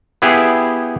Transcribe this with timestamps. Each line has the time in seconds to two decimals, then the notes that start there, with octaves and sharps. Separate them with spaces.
0.22 B3 E4 G4 G#4